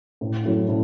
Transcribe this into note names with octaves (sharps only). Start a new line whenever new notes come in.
A2
F#3 A3 E4
A2